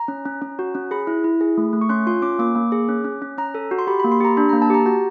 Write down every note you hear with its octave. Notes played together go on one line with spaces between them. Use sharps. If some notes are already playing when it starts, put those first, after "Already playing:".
Already playing: A#5
C#4
C#4
C#4
F#4
C#4
G#4 B5
E4
E4
G#4
A3
A3
C#6
C#4 C6
F4 C6
C#4 D6
A#3 D6
A#3
G#4
C#4
C#4
C#4
C#4 A#5
A4
F#4
C6
G4 B5
A#3 B5
C6
G4 A#5
D4 B5
A#3 A#5
A5
G4 A#5
F#4 A#5